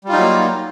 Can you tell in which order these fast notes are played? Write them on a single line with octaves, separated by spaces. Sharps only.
G3 F4 D#4 F#3 A#3